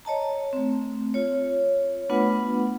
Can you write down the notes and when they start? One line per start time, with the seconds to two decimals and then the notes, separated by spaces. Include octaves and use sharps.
0.05 C#5 D#5 A5 A#5
0.53 A3 C4
1.14 F4 C#5
2.09 A3 B3 D4 F4 B4 F#5